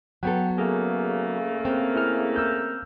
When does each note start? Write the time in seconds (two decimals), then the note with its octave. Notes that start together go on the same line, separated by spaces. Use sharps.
0.23 F#3 B3 A4 F#5 G5
0.58 C#3 A3 A#3 G#4
1.65 C4
1.96 E4 G#4 F6
2.36 E6 F6 G6